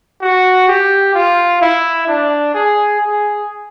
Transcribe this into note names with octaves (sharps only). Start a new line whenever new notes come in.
F#4
G4
F4
E4
D4
G#4
G#4